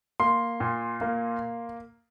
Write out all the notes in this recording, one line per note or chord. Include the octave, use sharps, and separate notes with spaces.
A#3 C6
A#2
A#3